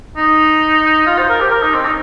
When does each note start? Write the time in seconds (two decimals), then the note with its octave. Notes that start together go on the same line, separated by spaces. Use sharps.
0.17 D#4
1.06 F4
1.18 C5
1.29 A#4
1.40 G4
1.51 A#4
1.62 D#4
1.74 C4
1.85 D#4